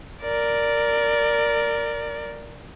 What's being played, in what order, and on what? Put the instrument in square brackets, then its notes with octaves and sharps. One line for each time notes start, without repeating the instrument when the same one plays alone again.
[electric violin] A#4 D5